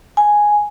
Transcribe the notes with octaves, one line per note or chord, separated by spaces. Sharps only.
G#5